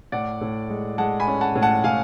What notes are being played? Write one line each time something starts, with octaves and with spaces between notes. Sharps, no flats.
A2 D5 F#5
A2
G#3
G#3 F#5 A5
G#5 B5
C#4
F#5 A5
A2
F#5 A5
A2 F5 G#5